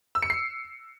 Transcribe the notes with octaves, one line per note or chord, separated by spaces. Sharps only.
E6
C#7
C7